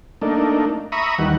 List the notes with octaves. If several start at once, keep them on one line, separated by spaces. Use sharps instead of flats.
A3 A#3 D4 D#4
E5 A#5 B5 C#6 D#6
D#2 D#3 E3 G3 F#5